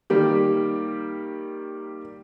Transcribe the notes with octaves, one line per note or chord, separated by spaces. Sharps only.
D#3 G3 A#3 G4